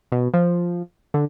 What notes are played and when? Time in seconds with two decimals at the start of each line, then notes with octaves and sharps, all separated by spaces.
0.12 B2
0.34 F3
1.14 D3